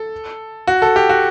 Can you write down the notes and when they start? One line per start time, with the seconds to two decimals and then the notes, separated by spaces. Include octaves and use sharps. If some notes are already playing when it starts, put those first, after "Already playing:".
Already playing: A4
0.67 F#4
0.82 A4
0.96 G4
1.09 F#4